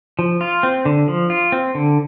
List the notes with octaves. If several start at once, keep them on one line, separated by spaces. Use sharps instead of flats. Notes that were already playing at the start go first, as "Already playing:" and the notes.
F3
F4
C4
D3
F3
F4
C4
D3